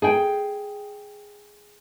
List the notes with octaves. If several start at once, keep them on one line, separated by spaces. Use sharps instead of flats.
G#4 G5